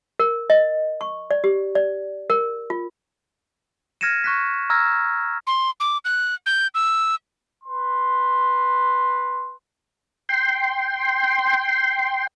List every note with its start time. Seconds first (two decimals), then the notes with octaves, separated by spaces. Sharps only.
0.20 A#4
0.50 D#5
1.01 C#6
1.31 D5
1.44 G4
1.75 D5
2.30 A#4
2.70 F4
4.01 F6 G#6 A#6 C#7 D#7 E7
4.24 C#6 F#6 B6
4.70 A#5 E6 F6 G#6 A#6
5.47 C6
5.80 D6
6.05 F#6
6.46 G6
6.75 E6
7.64 B4 C6
10.29 G5 C6